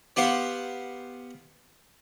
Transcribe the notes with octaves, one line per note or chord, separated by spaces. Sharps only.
B3 G4 C5 F5 F#5